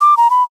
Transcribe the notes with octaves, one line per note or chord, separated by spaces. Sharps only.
D6
A#5
B5